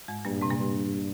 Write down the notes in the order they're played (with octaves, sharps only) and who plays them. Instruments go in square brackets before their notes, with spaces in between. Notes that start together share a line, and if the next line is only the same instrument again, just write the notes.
[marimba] G#2 G#3
[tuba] G2 [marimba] A#2 A#3
[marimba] C3 C4
A#2 A#3
[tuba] G2